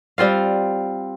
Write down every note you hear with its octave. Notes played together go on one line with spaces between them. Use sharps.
G3 C4 F4 F5